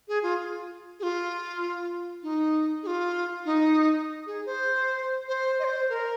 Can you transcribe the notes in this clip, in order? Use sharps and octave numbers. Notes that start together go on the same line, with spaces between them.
G#4
F4
G#4
F4
D#4
G#4
F4
D#4
G#4
C5
C5
D#5
C5
A#4